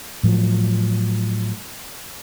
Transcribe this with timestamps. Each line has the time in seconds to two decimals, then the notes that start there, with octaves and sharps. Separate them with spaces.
0.23 A2 F3 F#3